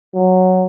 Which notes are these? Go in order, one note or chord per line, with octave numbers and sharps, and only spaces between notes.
F#3